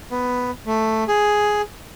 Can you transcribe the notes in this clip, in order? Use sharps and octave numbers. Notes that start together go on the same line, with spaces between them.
B3
A3
G#4